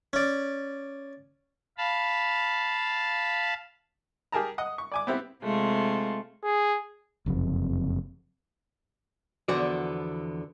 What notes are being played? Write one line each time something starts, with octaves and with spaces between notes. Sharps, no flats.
C#4 D5
F5 A5 B5
G4 G#4 A#4 A5 A#5
D#5 F#5 D#6
C#6
D5 G#5 D6
B3 C4 E4 G4
C3 G#3 A3 F4
G#4
F#1 F2 C3
E2 D3 F3 B3 F#4 D5